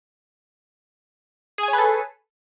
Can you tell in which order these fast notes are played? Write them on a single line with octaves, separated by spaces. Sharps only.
G#4 G#5 C#5 B4 A4